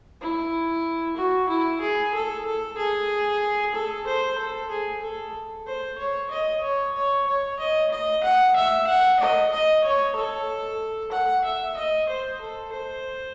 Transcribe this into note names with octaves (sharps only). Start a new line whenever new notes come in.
E4
F#4
E4
G#4
A4
A4
G#4
A4
C5
A4
G#4
A4
C5
C#5
D#5
C#5
C#5
C#5
D#5
D#5
F#5
E5
F#5
D#5
D#5
C#5
A4
F#5
E5
D#5
C5
A4
C5